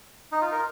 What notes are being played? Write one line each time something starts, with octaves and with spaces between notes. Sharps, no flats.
D#4
F4
A#4